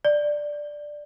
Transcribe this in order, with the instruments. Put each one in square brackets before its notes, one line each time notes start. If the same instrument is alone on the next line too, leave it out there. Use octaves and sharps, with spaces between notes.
[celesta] D5